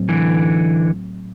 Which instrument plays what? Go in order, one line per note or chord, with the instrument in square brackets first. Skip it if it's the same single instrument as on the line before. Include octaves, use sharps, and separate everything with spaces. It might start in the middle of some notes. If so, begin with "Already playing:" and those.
Already playing: [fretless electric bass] A2 F#3 C4
[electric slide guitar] D3 E3